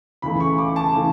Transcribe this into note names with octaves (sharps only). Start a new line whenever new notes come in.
C#2 C#3 E3 A3 B5
C#6
D6
A5
C#3 E3 A3 A5